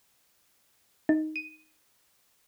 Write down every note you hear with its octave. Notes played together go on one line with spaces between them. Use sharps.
D#4
D#7